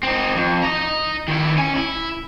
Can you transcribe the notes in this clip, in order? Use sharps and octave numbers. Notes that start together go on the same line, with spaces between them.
C4 D#4
F2
D#5 A#5
D#3 E4
C#4 G#5
E4